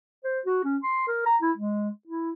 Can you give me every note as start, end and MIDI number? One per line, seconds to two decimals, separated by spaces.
0.24 0.40 72
0.46 0.59 66
0.64 0.77 61
0.83 1.05 84
1.08 1.23 70
1.26 1.37 82
1.42 1.51 64
1.57 1.89 56
2.07 2.32 64